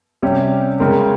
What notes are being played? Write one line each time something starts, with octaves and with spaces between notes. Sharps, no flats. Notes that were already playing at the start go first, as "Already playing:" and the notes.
C3 G3 C#4 G4
C#3 G#3 C4 A#4